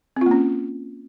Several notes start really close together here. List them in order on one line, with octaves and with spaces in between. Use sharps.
C4 F4 A#3 C#4